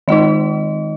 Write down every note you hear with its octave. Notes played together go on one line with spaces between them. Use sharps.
D#3 G#3 D#4 D#5